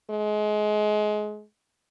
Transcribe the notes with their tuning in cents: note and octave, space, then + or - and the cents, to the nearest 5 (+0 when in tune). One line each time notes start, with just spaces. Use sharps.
G#3 +25